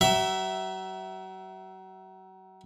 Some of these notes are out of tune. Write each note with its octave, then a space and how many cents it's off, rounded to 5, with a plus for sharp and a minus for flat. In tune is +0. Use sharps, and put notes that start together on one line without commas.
F#3 +35 E5 +0